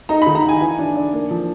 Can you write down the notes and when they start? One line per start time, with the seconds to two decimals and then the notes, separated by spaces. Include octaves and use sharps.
0.09 D#4 A#5
0.22 B5
0.27 D#3
0.35 A#5
0.44 D#4 G#5
0.60 E3 G#5
0.79 D4
0.95 D4
1.13 A#3
1.31 F3